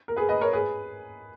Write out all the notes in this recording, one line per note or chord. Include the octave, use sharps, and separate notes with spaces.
A#4
G#4 B4
B4 D#5
A#4 C#5
G#4 B4